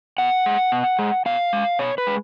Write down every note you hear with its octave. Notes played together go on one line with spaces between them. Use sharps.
B2 F#5
G#3
B2
G#3
B2 F5
G#3
B2 C#5
B4
G#3